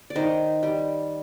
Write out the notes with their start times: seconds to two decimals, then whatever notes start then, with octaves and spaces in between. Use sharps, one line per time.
0.10 D5
0.16 D#3 C5 D#5
0.63 G3